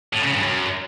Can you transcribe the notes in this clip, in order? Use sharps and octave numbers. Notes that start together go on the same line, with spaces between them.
A2
C#3
G2
F#2